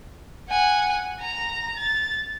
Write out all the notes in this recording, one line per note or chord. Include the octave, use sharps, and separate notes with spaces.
F#5 G#5
A#5 A#6
A6